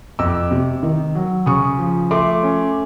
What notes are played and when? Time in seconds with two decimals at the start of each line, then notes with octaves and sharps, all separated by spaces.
0.19 F2 D6 E6
0.51 C3
0.83 D#3
1.15 F#3
1.46 C#3 C#6 D#6
1.79 F3
2.11 A3 C6 D6
2.43 C#4